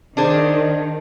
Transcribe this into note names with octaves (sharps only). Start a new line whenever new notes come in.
D#3 D4 G#4 C5